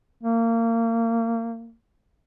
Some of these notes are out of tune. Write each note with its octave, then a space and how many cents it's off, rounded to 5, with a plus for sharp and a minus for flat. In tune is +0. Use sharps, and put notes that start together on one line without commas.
A#3 -25